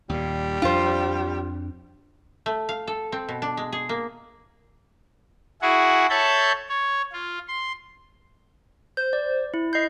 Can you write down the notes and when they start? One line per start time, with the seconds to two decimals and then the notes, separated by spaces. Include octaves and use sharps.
0.09 D#2 A#2 G3
0.62 F2 D4 F4 C5
2.46 A3
2.69 F5
2.87 A4
3.12 C4
3.29 B2
3.42 D4
3.57 G#3
3.72 G#4
3.89 A#3
5.62 E4 F#4 G#4 F#5
6.10 A4 C#5 E5 A5 B5 G6
6.69 C#5
7.13 F4
7.48 C6
8.97 C5 G6
9.13 D5
9.54 E4
9.73 D#5 G6 C7